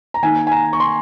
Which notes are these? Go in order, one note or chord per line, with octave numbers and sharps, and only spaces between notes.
A#5
D#3 A#3 D#4 G#5
G#5
A#5
C#6
C6